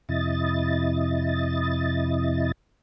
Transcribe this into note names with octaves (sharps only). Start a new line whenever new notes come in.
F2 C3 E4 D#5 A6